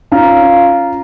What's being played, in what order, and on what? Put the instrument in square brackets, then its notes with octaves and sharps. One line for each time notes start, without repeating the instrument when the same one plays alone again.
[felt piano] C#4 A#5 [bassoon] F4